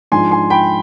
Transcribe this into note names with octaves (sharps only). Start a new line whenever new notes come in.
G#2 F3 G#3 D4 G#5 C6
G#5 C6
G5 B5